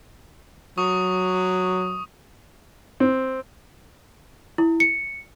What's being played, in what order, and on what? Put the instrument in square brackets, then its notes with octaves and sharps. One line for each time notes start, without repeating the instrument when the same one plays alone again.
[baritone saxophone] F#3 [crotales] C#6 D#6
[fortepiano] C4
[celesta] E4
C#7